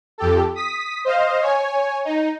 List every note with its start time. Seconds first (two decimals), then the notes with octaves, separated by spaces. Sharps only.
0.18 F2 G4 A4
0.55 D#6 B6
1.05 C5 D#5 F5
1.41 C#5 G#5
2.05 D#4